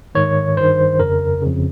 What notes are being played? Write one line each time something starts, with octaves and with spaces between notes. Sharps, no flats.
G#2 D#3 C#5
G2 D#3 C5
F2 C#3 A#4
F2 C#3